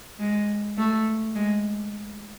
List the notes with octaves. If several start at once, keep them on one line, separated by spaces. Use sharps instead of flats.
G#3
A3
G#3